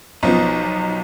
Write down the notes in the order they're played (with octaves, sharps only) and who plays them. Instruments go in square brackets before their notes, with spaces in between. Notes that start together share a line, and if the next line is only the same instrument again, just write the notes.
[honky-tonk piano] B1 F3 B3 [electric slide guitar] D#4